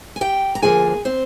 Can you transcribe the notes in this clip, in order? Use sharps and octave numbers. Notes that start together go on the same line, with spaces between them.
G#5
G4 G5
A#5
D2 D3 F3 A#3 G#4 G#5
C4 C5